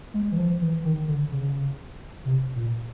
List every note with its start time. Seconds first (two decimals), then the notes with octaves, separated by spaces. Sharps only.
0.14 G#3
0.32 E3
0.37 F3
0.61 E3
0.84 D#3
1.08 D3
1.31 C#3
2.25 C3
2.56 A#2